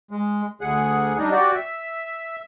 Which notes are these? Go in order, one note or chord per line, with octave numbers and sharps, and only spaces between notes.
G#3
D2 G#4 F#5
G3 D4 D#4
F#4 G4 D5
E5